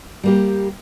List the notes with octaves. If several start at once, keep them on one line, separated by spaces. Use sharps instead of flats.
G3 A#3 G4